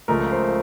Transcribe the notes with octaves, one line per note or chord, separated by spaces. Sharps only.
C#2 C#3 F3 A3 A#4
C5